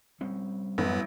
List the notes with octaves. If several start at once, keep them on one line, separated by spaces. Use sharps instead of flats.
G3 C4 C#4
A1 F#2 B3